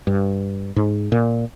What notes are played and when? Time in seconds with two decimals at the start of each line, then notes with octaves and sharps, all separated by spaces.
0.07 G2
0.76 G#2
1.12 A#2